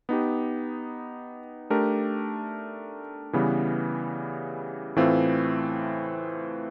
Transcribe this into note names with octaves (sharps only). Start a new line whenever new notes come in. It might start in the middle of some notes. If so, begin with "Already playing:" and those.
B3 D#4 G4
A3 D4 G4 A#4
C#3 E3 G3 B3
A2 E3 A3 C4 F4